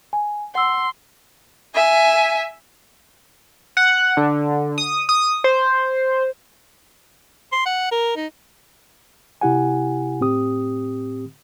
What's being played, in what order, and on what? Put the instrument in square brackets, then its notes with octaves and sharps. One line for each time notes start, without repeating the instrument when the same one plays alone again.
[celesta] G#5
[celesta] F#5 E6 [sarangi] C6
[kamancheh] E5 G#5
[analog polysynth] F#5
D3
D#6
D#6
C5
[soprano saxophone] C6
F#5
A#4
D#4
[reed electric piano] C3 E4 G4 F#5 G#5
A2 C4 G4 D#6